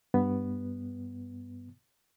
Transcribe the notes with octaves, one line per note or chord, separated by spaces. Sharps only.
G2 B3